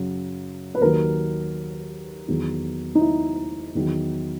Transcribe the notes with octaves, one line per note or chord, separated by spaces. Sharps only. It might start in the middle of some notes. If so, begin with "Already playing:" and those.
Already playing: F#2 C#3 F#3
B4
D#2 D#3 F#3 A#4
E2 D#3 F#3
D#4
E4
E2 D#3 F#3